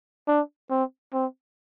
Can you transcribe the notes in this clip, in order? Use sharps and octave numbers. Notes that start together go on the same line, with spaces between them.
D4
C4
C4